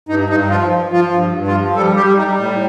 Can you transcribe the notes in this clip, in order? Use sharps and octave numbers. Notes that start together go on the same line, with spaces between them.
G2 D#4
G2 D#4
F3 F4
F3
F3 F4
G2
G2
F4
F3
G3 A4
G3 G4
G3 D#4
A2